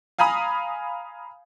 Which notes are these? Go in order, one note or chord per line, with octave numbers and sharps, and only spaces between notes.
F5 G#5 A#5 B5 D#6